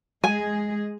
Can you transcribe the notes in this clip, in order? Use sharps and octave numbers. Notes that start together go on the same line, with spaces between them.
G#3 G#4 G#5